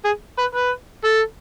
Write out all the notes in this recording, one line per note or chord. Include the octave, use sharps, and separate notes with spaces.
G#4
B4
B4
A4